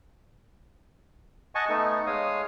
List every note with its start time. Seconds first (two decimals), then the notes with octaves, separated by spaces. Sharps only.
1.55 D#5 F#5 G#5 A5 C#6
1.69 A3 B3 D#4
2.07 G#3 C#5 F5 D#6